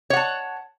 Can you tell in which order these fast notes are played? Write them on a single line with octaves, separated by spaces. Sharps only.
C#5 F#5 A5